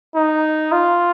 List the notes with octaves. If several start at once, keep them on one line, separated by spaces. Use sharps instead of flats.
D#4
F4